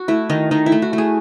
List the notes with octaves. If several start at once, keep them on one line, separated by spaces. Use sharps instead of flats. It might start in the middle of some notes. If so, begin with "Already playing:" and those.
Already playing: F#4
A3 E4
D#3 D#4
D#3 D#4
E4
A3
F#4
A3
G#4